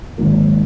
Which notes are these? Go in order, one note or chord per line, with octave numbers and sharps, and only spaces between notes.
G#1 G#2 D#3 F#3 A#3